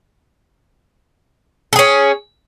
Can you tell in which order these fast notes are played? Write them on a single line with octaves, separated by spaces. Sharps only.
A4 G#4 C#4